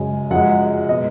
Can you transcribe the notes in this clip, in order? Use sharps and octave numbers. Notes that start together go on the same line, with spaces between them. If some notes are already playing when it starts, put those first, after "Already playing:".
Already playing: F#2 C#3 G#3 G#5
F#2 F3 G#3 F#5
B2 G#3 D#5